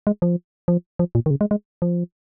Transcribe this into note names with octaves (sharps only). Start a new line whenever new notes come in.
G#3
F3
F3
F3
A#2
D#3
C#3
G#3
G#3
F3